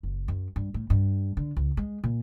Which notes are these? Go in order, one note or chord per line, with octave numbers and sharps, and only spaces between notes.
F#1
F#2
G2
A2
G2
D3
C#2
G#3
A#2